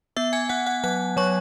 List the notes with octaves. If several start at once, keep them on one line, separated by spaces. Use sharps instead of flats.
B3 E5 E6
G#5 G#6
B3 F#5 F#6
F#5 F#6
F#3 F#5 F#6
F#3 C#5 C#6